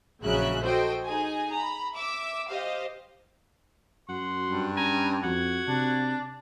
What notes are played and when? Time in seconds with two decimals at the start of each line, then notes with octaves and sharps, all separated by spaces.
0.22 A#1 C#3 F#3 G#3 E5 F#6
0.61 F#4 A4 C5 D#5 G5
1.04 D#4 G#4 G#5
1.51 A#5 B5
1.93 E5 D6 E6
2.50 G4 C5 D#5 F5
4.09 F#2 F#4 C6
4.47 G2
4.77 C#4 G#5 A#5
5.23 F2 F#4 G#6
5.68 C3 D4